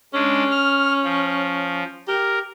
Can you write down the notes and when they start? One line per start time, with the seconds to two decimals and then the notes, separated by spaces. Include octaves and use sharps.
0.14 G#3 C#4 D4
0.51 F6
1.04 F3
2.08 G4 A#4